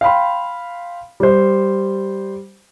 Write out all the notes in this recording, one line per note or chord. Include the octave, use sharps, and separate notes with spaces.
F5 G5 B5 C6
G3 C5